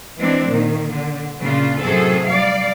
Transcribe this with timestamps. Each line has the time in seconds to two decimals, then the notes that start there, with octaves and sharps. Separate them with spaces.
0.18 E3 G#3 C4 D4
0.47 A#2 D#3
0.90 D3
1.40 A#2 C#3 D4 F4
1.81 F#2 A2 C3 C4 G#4 A4
2.25 G3 D5 F5